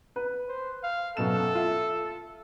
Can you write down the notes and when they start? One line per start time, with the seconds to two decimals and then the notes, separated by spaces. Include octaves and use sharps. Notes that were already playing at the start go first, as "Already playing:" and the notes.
0.16 B4
0.48 C5
0.83 F5
1.17 F#2 B2 A4 E7
1.55 F4 E5